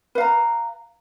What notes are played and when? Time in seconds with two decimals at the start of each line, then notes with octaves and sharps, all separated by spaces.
0.15 B4
0.18 F5
0.20 A#5